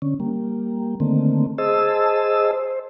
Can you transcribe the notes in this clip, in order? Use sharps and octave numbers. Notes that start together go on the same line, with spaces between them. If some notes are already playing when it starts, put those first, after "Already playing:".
D3 C#4
G3 A#3
D3 D#3 A3 A#3 C4
G#4 C5 D#5 A5 E6
C5